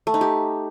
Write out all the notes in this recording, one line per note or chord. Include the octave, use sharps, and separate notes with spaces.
A3
D#4
G4